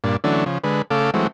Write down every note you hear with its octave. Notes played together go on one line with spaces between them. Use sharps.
G2 A#2 D4
D3 E3 F#3 A3 C#4 D4
C#3 F3
D3 G#3 B4
C#3 A3 A4 F5 D6
E3 F#3 G#3 A3 C4